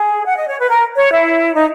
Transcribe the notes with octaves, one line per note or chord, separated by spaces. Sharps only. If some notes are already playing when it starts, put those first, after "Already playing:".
Already playing: G#4
F#5
D#5
C#5
B4
A#4
C#5
E4
D#4